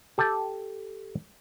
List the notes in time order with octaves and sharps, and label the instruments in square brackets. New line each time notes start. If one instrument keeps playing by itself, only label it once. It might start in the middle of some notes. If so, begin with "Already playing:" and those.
[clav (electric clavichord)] G4 A4 G5 A5